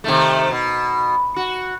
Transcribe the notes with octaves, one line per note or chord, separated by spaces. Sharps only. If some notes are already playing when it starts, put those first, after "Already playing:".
C3 D#3 A3
B2
F#4